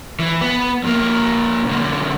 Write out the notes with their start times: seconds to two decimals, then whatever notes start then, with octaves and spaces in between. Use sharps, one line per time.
0.20 E3
0.41 B3
0.84 F2 A#3
1.65 B1 D3